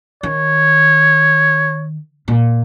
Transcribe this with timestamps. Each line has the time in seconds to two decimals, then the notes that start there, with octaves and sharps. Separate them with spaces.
0.23 D#3 C#5
2.28 A#2